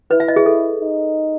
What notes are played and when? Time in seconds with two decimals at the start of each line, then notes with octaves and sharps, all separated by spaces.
0.11 E4 B4
0.20 E5
0.28 D#5
0.36 G#4
0.46 A4
0.80 D#4